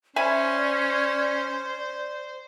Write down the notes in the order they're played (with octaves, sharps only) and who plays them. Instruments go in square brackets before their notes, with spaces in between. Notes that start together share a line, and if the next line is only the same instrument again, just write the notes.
[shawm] C#4 [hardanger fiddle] C5 [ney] D5 [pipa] E5 G#5 B5